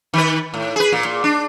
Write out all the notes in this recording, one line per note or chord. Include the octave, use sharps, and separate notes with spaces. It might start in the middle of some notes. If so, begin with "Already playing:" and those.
D#3 B4
A2
G#4 B4
A#2
A#2
D4